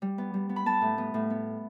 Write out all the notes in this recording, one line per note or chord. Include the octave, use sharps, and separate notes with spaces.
G3
B3
G3
B3
B5
B3 A5
A2
B3
A2
B3